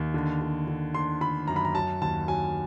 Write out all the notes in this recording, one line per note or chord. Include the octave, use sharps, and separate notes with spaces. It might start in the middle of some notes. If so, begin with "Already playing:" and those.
Already playing: D#2
D3
D3
D3
D3 C6
D3 B5
F#2 A#5
B5
A#5
F#3 A5
D#2 A5
F#3 G#5